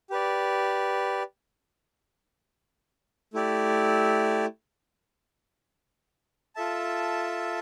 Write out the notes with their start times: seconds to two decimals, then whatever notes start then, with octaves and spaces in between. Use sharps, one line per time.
0.10 G4 B4 D5
3.33 A3 E4 G4 D5
6.55 F4 A4 E5 A5